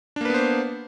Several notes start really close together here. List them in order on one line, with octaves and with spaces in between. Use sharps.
D4 A#3 B4 B3 C5